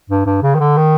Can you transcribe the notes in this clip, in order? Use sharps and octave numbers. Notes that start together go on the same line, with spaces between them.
G2
G2
C#3
D#3
D3
D#3